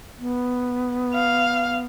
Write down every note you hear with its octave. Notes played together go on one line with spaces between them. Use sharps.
B3
F5